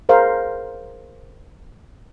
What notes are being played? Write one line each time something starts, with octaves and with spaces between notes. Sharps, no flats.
G#4 A#4 C5 F5